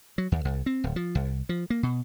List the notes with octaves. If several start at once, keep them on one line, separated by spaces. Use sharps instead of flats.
F#3
D#2
C2
C4
D1
F3
C2
F3
A#3
B2